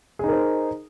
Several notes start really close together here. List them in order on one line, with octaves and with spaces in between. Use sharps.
G#4 D#4 A#4 C5